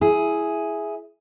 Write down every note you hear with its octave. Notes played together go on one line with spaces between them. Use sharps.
E4 G#4